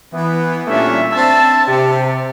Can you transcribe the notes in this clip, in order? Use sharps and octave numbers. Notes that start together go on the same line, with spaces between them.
E3 B3
A#2 G3 A3 C#4 D4 E5
C4 D4 E5 A5
C3 G4